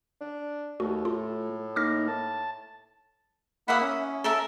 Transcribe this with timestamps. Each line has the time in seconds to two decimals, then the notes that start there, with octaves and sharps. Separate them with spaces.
0.21 D4
0.80 D#2 A3 F#4
1.05 A2 F4
1.76 A#3 D#4 D6 F6 A#6
2.08 A5
3.68 A#3 E4 E5 F#5 B5 D#6
3.81 C#4
4.24 A4 A#4 E5